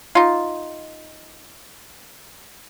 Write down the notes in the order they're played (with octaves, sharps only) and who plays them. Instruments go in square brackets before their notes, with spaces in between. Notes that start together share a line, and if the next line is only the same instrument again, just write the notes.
[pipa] D#4 F4